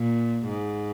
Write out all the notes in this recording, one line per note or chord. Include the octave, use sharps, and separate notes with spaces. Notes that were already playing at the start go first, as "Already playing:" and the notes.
Already playing: A#2
G#2